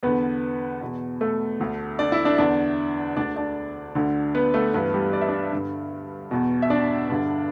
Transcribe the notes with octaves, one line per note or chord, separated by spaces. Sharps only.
E2 D3 B3 B4
E2 B2
A3 A4
D2 D3
D4 D5
E4 E5
D4 D5
E2 D3 D4 D5
D2 D3 D4 D5
D4 D5
D2 D3
B3 B4
A3 A4
G2 E3 B3 B4
G3 G4
D5
E5
D4 D5
G2 D3
E2 B2
E5
D4 D5
G2 D3